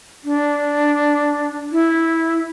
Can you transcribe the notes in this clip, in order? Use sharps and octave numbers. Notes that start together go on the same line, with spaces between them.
D4
E4